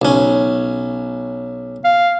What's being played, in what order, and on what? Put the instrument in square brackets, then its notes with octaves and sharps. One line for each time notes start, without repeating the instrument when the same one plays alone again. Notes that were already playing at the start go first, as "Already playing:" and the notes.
[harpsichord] B1 C#4
[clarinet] F5